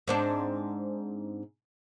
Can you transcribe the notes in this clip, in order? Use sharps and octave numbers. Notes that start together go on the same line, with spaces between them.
G#2 C4 D4